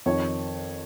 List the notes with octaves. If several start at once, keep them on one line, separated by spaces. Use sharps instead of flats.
F2 D#3 C#5